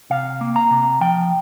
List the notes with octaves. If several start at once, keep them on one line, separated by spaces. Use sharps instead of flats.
C3 F5
A#3
A#5
C3
F3 G5